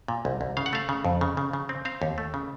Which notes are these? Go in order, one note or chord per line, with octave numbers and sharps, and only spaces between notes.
A#2
C2
C2
C#3 F5
F#5
A3 F5
C#3
F2
C#3
C#3
C#3
C4
C4 F5
D#2
A3
C#3